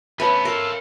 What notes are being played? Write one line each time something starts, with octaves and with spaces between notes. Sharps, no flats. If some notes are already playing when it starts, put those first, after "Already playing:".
D2 B3 C#4 B4 E5 A5 B5
F4 A4 A#4